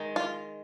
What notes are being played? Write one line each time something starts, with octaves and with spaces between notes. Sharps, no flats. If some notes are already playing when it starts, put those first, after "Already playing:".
Already playing: D#3 G#3
F4